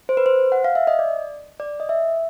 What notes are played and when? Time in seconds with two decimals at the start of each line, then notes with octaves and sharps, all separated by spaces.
0.09 C5
0.17 B4
0.26 C5
0.52 F#5
0.64 F5
0.75 E5
0.87 D#5
0.99 D5
1.60 D5
1.80 D#5
1.89 E5